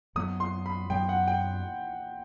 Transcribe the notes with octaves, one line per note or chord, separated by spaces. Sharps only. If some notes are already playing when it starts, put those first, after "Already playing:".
F#2 F#3 B3 D#6
C6
B5
F#2 F#3 B3 G5
F#5
G5